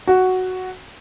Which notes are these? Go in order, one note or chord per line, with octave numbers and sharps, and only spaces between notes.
F#4